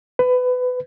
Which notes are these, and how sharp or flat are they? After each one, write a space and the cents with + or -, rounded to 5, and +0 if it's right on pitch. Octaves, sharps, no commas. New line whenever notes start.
B4 +25